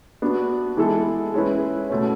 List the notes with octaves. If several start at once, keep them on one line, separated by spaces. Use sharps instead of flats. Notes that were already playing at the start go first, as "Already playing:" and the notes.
B3 D4 F#4
E3 G#3 B3 E4 A4
G#3 C#4 E4 B4
B2 A3 C#4